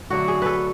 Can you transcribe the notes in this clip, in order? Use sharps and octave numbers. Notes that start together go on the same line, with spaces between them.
D3 F#3 A3 D4 F#4
G#4
A4 B4